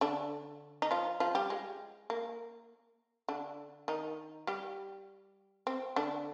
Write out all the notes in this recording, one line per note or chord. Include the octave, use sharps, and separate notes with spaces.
D3 D4
D#4
F3 F4
F3 F4
G3 G4
G#3
A#3
D3 D4
D#3 D#4
G3 G4
C4
D3 D4